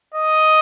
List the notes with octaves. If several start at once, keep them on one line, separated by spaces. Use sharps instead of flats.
D#5